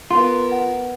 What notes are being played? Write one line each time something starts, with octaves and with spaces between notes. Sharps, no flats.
B3 F4 A#4 C6
F#5